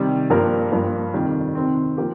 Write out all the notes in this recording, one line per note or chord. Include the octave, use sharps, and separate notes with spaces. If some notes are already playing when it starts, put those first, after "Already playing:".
Already playing: C3 D#3 G3
G2 F3 A#3 G4 A#4
G2 F3 A#3
F2 C3 D#3 G3
C3 D#3 C4
F3 A#3 G4